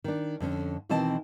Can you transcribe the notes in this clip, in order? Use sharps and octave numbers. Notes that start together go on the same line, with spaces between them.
D#3 D4
F2 D3 C#4
B2 D#3 E3 C4 D#5 A5